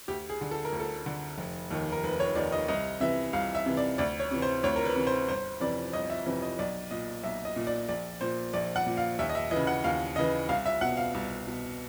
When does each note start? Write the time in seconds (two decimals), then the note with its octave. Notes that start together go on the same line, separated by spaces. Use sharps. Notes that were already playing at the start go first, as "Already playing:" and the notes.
0.08 D2 G4
0.30 G#4
0.41 D3
0.51 A4
0.65 A#4
0.73 D2
0.80 A4
1.06 D3
1.38 F1
1.71 D#2 D#3
1.92 A#4
2.03 F1 B4
2.20 C#5
2.35 D#2 D#3 D5
2.52 D#5
2.68 C2 D#5
3.00 C3 E3 E5
3.33 C2 F5
3.55 E5
3.66 C3 E3
3.77 D5
3.98 D2 D5
4.20 C#5
4.31 C3 E3
4.42 C5
4.64 D2 C#5
4.76 A#4
4.85 B4
4.96 C3 E3
5.07 C5
5.29 G1 C5
5.60 F2 C3 E3 D5
5.93 G1 D#5
6.10 E5
6.26 F2 C3 E3
6.42 D#5
6.59 B1 D5
6.91 A#2 D#5
7.23 B1 E5
7.45 D#5
7.56 A#2
7.67 D5
7.89 A#1 D5
8.21 A#2 C5
8.53 A#1 D5
8.76 F#5
8.86 A#2
8.97 F5
9.19 D#2 E5
9.29 D#5
9.35 E5
9.51 E3 D#5
9.55 C#3
9.67 F#5
9.84 D#2 F5
10.16 C#3 E3 D#5
10.49 C2 F5
10.66 E5
10.81 B2 F#5
10.97 F5
11.14 C2
11.47 B2